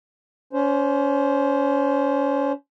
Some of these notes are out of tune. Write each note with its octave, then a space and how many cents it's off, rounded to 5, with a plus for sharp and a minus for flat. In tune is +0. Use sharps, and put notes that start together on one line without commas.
C#4 +30 C5 +0